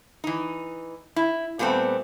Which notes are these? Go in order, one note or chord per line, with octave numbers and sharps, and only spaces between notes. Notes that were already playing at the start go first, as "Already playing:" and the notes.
E3 D#4
E4
A#2 G3 A3 B3 C4